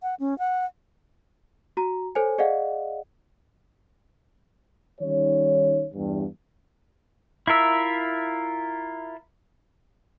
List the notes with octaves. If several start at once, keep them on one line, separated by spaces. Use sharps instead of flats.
F#5
C#4
F#5
F#4 A#5
A4 C5 C#5 G#5
G#4 D5 D#5 F5 F#5
D#3 G3 C#4 D#4 C#5
E2 G2
E4 F4 A#4 E5